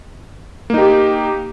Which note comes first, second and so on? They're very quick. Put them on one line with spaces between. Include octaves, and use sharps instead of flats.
A#3 D#4 G4